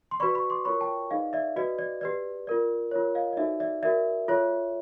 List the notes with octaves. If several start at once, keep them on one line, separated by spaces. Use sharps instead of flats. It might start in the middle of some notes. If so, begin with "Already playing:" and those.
C6
F#4 B4 D5 B5 C#6
B5 C#6
C6 D6
F4 A#4 C#5 B5 C#6
G5 A5
D#4 G#4 B4 D5 D#5 F5
D5 E5
F#4 B4 D5 D#5
D5
G4 B4 D5
F4 A#4 D5
F4 A#4 C#5
D#5 F5
D#5
D#4 F#4 A4 C5 D5 E5
D5 E5
F#4 A#4 D5 E5
F4 A4 C#5